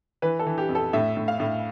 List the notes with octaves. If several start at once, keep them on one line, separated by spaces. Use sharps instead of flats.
E3 B4
A4
E3
G4
F2
A4
A2 E5
A2
F5
A2